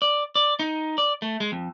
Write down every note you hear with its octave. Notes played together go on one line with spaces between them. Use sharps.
D5
D5
D#4
D5
A3
G#3
F2